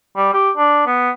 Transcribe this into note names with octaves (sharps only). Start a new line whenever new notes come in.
G3
G4
D4
B3